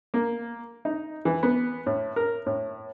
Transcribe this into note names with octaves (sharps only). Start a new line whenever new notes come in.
A#3
D#4
E3
B3
A2
A#4
A2